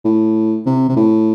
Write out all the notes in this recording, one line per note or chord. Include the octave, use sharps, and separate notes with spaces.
A2
C3
C3
A2